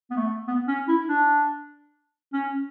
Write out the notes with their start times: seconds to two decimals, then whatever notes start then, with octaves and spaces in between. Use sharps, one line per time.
0.10 B3
0.17 A3
0.48 B3
0.68 C#4
0.88 E4
1.09 D4
2.33 C#4